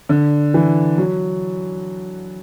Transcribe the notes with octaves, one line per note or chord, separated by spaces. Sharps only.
D3
E3
F#3